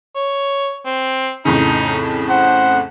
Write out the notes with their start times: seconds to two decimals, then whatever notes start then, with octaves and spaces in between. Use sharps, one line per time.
0.16 C#5
0.85 C4
1.45 F2 A2 C#3 D#4
2.29 C5 F#5